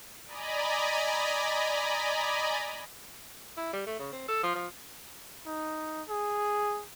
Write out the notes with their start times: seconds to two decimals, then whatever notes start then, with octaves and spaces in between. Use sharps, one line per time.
0.26 D5 D#5 G#5 A#5 B5
3.57 E4
3.73 G3
3.86 A3
3.99 C#3
4.13 C4
4.28 A4
4.43 F3
4.55 F3
5.46 D#4
6.09 G#4